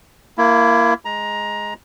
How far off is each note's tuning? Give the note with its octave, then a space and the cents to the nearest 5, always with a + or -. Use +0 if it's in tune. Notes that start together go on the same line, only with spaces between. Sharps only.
A#3 +0 E4 +25
G#3 +0 A#5 +15